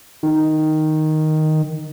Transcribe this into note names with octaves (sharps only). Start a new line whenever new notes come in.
D#3